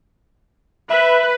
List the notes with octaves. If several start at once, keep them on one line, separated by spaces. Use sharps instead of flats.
B4 E5